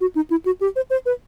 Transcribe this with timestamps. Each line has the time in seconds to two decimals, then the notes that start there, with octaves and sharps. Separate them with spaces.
0.01 F#4
0.15 D#4
0.30 E4
0.46 F#4
0.61 G4
0.76 C5
0.90 C5
1.06 B4